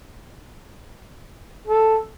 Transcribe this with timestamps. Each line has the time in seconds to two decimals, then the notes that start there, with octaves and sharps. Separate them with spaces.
1.67 A4